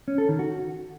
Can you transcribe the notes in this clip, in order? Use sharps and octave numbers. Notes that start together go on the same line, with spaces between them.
C#4
A4
D#3
F#4